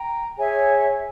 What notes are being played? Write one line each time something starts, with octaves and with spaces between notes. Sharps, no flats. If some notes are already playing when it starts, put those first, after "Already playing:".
Already playing: G5 A#5
G#4 C#5 E5 G#5